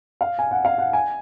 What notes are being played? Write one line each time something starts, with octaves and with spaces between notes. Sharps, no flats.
F5
G#5
F#5
F5
F#5
G#5